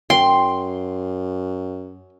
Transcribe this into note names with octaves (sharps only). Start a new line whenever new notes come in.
F#2 G5 C6